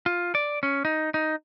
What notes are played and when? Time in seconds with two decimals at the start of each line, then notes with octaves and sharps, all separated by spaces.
0.06 F4
0.35 D5
0.63 C#4
0.85 D#4
1.14 D#4